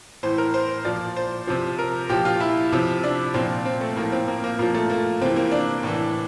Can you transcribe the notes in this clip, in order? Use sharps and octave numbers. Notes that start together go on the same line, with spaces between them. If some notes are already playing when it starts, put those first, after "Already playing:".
A2 E3 C5
A#4
C5
A#2 F3 D5
C5
C3 F3
A#4
A#2 F3 G4
F4
E4
C3 F3
D4
A#2 F3 C4
C4
A3
A2 F3 A#3
C4
A#3
A#3
A#2 F3 A#3
A3
A#3
C3 E3 C4
A#3
D4
A2 E3